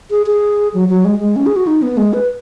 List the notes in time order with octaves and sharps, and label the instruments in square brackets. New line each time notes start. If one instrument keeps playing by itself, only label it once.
[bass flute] G#4
G#4
F#3
F#3
G#3
G#3
C#4
G#4
F#4
D#4
B3
G#3
B4